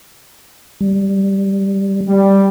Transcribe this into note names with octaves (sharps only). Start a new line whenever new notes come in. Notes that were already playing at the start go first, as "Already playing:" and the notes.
G3
G3